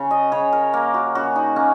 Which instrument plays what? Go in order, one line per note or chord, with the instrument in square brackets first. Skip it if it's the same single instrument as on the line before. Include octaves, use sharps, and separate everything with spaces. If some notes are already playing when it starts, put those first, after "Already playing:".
Already playing: [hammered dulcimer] C#3 C#5
D#5
C#3 C#5
A#4
A#3
F#4
C#3 F#4
D#4
A#3 C#4